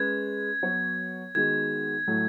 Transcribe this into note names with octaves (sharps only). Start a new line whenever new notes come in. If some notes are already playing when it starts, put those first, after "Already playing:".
Already playing: G#3 C#4 G#4 B4 G#6
F#3 B3 F#4 C#5
D#3 G#3 B3 D#4 F#4 G#6
A2 F#3 A3